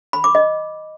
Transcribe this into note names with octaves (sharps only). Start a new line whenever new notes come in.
B5
D6
D#5